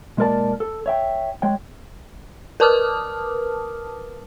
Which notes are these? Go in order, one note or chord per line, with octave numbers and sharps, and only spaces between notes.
B1 G#3 A#3 A#4 D5 A5
A4
C#5 E5 G5
G#3 C#5 G5
A#4 B4 A5 D6 D#6 F6